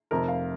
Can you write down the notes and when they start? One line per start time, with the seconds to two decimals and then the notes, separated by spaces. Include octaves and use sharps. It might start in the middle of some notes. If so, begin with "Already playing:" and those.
0.11 F1 F2 C3 A#4
0.28 F5